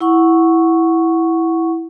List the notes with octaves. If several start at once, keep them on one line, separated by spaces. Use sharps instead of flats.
E4 F#5 C#6